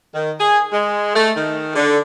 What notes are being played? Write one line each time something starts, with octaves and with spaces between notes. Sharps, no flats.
D#3
G#4
G#3
A3
D#3
D3